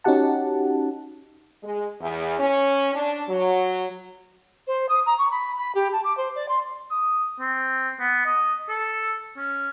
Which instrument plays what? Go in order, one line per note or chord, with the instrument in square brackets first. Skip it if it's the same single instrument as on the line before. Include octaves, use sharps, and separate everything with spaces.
[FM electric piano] C#4 D#4 F#4 G4 F#5 A5
[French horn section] G#3
E2
C#4
D4
F#3
[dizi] C5
D#6
A#5
C#6
B5
B5
G4
A5
D6
C5
D5
C6
[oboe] D#6
C4
B3
D#5
A4
C#4